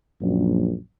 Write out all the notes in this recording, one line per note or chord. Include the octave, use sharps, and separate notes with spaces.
A#1 F#2